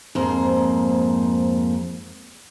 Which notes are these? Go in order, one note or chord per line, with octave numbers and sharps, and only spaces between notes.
F2 G#2 A#3 C5